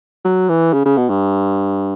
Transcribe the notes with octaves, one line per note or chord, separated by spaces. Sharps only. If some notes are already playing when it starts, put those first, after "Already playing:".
F#3
E3
C#3
C#3
B2
G2